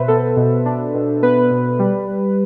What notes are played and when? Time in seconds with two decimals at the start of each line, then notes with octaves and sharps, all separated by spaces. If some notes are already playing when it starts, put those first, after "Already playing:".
Already playing: B2 B4 C5 E5
0.08 B3 A4
0.37 B2
0.66 D4
0.94 B2
1.23 B3 B4
1.51 B2
1.79 G3